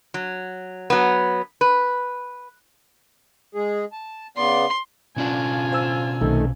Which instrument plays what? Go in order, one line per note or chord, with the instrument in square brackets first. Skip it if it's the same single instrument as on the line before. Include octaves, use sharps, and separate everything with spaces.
[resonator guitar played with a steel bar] F#3
F#3 B3
B4
[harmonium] G#3 G#4
A5
[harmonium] C#3 B3 D5 [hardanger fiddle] C6
[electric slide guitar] B2 C#4 D4 [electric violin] F4 G#5
[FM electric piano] C5 E6
[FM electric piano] B1 C3 [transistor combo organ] D#3 A3